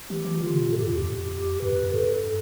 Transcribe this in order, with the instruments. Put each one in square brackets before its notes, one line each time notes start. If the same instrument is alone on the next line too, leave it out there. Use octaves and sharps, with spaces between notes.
[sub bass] E3 [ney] G4
[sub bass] E3
[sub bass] D3 [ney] F4
[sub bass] B2
[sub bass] A2 [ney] A4
[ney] G4
[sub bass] G2
[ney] F4
[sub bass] E2 [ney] G4
[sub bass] F2
[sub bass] G2 [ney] B4
[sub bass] F2
F2
[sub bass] G2 [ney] A4
[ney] A4